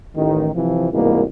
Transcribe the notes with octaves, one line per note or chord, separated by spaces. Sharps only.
A1 D#3
C3 E3 F3
C2 G#2 B2 E3 A#3